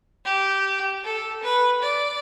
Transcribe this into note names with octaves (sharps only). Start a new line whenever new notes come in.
G4
A4
B4
D5